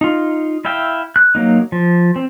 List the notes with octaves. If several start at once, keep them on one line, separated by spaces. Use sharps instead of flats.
D#4 F4
E4 E5 F5 G5
F#6
F#3 A#3 D#4
F3
C4